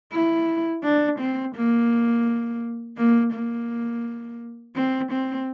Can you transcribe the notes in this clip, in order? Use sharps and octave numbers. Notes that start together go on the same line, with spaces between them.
E4
D4
C4
A#3
A#3
A#3
C4
C4